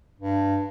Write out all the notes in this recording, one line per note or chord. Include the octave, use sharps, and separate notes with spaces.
G2